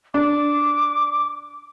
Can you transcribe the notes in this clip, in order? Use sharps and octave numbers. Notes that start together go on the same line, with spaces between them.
D4 D6